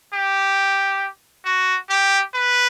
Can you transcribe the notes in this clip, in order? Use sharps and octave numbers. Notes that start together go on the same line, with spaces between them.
G4
F#4
G4
B4